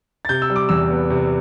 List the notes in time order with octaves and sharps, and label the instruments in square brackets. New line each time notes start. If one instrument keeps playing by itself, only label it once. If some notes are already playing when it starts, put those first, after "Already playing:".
[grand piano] A6
C3 G6
E6
G3
D6
E2 E6
B3
C3